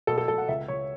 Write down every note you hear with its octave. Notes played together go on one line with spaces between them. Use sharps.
B2 A4
A4
B2 A4
F#5
C#2 E5
C#2 C#5